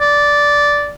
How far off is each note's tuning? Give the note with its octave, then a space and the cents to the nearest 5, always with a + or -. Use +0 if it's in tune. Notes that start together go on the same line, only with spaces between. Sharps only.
D5 -10